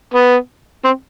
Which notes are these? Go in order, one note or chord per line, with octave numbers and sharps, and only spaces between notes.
B3
C4